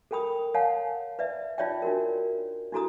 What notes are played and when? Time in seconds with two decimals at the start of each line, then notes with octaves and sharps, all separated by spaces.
0.11 A4 A#4 G5 B5 D#6
0.54 C#5 F5 F#5 G#5 A5
1.19 B4 D5 E5
1.58 D#4 F4 C#5 D5 E5 G5
1.82 D4 F#4 A#4
2.72 D4 E4 F#4 A4 A#5 D#6